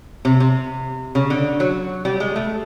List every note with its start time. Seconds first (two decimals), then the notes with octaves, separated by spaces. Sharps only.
0.25 C3
0.40 C3
1.15 C#3
1.30 D3
1.60 F#3
2.05 G3
2.20 G#3
2.36 A3